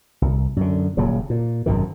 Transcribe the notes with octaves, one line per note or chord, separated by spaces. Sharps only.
C2
F#2 D3
D#1 A#2 C#3 F#3
A#2
G#1 F#2 B2 D#3